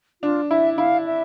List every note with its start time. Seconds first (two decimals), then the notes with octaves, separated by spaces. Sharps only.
0.22 D4 F4
0.50 E4 E5
0.78 E4 F5
1.05 E5